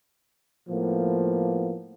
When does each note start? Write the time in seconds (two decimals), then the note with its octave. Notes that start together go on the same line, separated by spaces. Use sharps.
0.68 A2 F3 A#3 B3